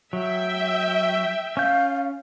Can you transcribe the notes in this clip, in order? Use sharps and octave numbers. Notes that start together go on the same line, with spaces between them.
F#3 E5 G5
C#4 F5 G6